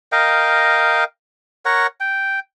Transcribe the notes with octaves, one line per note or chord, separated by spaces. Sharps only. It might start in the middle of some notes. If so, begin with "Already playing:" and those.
A#4 D#5 F5 G5
A#4 C#5 F#5
G5